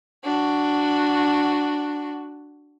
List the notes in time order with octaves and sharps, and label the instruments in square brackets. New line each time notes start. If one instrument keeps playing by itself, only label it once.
[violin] D4 F#4